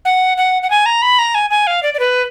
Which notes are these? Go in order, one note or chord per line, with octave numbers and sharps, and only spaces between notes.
F#5
F#5
F#5
G#5
A#5
B5
A#5
G#5
G#5
F5
D5
D5
B4